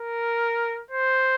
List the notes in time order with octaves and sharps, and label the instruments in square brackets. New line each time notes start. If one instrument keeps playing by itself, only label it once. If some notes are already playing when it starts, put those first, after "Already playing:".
Already playing: [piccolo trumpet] A#4
C5